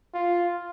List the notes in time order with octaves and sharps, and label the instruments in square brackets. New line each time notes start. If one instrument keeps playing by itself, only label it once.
[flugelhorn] F4